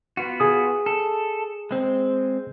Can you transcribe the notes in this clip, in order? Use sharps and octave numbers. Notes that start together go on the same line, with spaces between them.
B3 F4 F#4
G#4 D#6
A4
G#3 C4